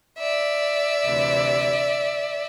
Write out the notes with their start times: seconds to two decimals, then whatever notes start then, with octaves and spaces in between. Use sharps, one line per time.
0.19 D5 E5
1.04 D2 C3 E3